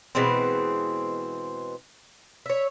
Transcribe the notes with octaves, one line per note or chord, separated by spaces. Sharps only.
B2 E3 G#3 C4
C#5 E5